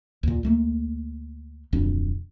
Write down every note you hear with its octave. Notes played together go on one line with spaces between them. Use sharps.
D#2 A#2
D2 A3 A#3
D1 F2 B2 D4